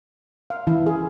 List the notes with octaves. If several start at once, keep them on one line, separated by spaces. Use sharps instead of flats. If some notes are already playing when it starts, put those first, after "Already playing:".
F5
E3 E4
G#4